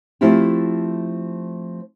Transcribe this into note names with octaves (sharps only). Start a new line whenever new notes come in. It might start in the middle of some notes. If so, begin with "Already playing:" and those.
F3 A3 C4 E4 F4 G4